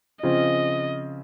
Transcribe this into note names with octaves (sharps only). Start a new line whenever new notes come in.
C#3 F3 C4 F4 D#5